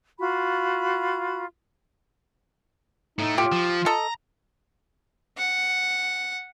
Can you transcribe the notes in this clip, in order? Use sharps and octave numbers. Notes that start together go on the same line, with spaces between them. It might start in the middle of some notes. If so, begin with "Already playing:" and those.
F4 F#4 B5
A2 A3 D#4
F4 G4
F3
A4 D#5 A#5
F#5